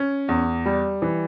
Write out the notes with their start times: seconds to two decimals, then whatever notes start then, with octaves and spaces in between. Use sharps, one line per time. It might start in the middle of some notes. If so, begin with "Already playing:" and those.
Already playing: C#4
0.28 E2
0.65 G3
1.02 E3